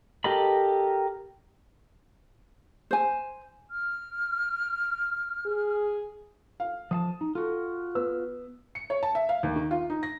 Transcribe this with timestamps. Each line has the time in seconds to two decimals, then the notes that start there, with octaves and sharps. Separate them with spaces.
0.24 G4 A4 A#4 D#5 B5
2.91 C5 G#5
3.70 F6
5.46 G#4
6.60 F5
6.91 F3 F5 A5 D#6
7.21 D#4
7.35 F4 F#4 A4
7.95 B3 E6
8.75 C#7
8.90 C#5
9.03 A5
9.15 E5
9.29 F5
9.43 D#2
9.56 D#3
9.71 F4
9.90 D#4
10.03 A#6